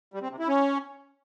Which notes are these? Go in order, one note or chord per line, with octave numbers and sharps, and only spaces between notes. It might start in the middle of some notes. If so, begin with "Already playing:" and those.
G3
C4
C3
E4
C#4